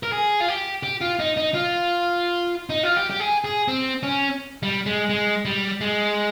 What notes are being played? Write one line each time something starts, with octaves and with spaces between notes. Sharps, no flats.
A#4
G#4
F4
G4
G4
F4
D#4
D#4
F4
D#4
F4
G4
G4
G#4
G#4
C4
C#4
G3
G#3
G#3
G3
G#3